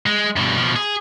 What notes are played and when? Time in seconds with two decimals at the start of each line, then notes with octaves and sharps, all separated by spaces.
0.06 G#3
0.36 G2 B2
0.57 B2 F3
0.76 G#4